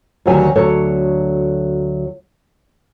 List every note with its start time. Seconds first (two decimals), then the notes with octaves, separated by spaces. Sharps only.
0.26 D2 D#3 F#3 G4 G#5
0.56 D2 F#3 A4 C#5